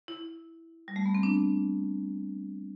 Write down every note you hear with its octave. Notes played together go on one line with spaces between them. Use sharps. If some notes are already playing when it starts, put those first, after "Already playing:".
E4
G3
A3
B3
C4
D4